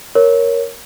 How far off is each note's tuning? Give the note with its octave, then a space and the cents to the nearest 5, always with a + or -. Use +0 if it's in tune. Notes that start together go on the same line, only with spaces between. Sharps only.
A#4 +0 C#5 +0